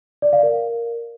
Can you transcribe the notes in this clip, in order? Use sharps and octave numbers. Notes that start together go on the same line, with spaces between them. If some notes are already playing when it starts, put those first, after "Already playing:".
D5
F5
A#4